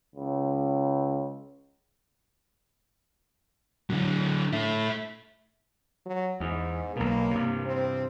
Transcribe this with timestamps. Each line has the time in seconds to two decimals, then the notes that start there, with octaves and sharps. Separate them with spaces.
0.15 C#2
3.90 D3 F#3
4.53 A3 E4
6.05 F#3
6.40 E2 G#2
6.96 B1 B2 A#3
7.31 G2 C3
7.66 C4